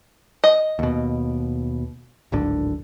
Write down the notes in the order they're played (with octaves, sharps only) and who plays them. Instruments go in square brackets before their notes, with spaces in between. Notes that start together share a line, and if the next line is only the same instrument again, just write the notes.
[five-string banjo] D#5
[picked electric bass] D#2 B2
D1 G#1 D3